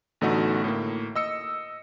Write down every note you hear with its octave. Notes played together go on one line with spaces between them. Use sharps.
A1 D3 A3 B3 D#4 F#4
A2 A#3
D#5 E6 C#7